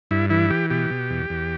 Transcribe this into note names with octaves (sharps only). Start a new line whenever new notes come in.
G2 E4
E3 E4
E3 G4
B2 G4
B2
E2
E2